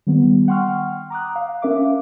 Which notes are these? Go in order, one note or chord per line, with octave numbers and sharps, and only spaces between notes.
D#3 G3 B3
F#5 G5 C6 C#6 F6
A#5 D6 D#6 F#6
F5
C#4 A#4 E5 F5 D6